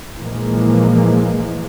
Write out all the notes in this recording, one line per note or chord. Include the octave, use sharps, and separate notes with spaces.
A#2 E3 F3 G#3 A#3